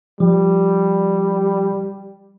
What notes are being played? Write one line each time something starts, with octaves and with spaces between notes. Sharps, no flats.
F3 G3